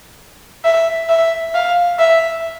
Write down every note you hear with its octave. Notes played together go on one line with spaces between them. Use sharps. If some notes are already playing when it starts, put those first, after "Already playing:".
E5
E5
F5
E5